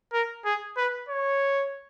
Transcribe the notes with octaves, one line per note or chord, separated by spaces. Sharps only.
A#4
G#4
B4
C#5